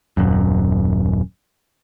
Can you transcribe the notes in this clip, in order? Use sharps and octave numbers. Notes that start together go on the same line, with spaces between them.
D#1 F#2